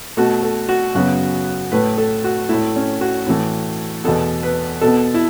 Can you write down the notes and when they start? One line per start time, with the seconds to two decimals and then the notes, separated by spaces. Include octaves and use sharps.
0.17 B2 A3 F#4
0.43 A4
0.69 F#4
0.95 F#2 C#3 F#3 B3 F#4
1.72 A2 A3 B4
1.98 A4
2.24 F#4
2.49 A2 A3 E4
2.76 C#4
3.01 F#4
3.27 A2 E3 A3
4.04 E2 B2 B3 A4
4.43 B4
4.81 B2 B3 A4
5.14 E4